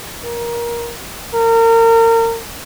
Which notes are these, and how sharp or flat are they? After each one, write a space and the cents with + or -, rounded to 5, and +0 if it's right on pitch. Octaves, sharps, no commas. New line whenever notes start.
A#4 +15
A#4 -35